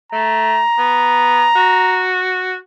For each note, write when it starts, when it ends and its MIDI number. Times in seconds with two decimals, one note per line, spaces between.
0.13 0.61 57
0.13 2.08 82
0.78 1.46 59
1.56 2.56 66